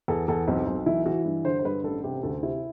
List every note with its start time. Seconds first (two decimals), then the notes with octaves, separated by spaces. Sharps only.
0.08 E2 A4
0.28 E2 A4
0.48 B1 C4
0.67 B1
0.86 E3 E4
1.06 E3 F#4
1.25 G2
1.45 D3 C5
1.59 C5
1.65 G2 B4
1.84 A1 A4
2.04 C3 G4
2.23 D2 A4
2.42 C3 E4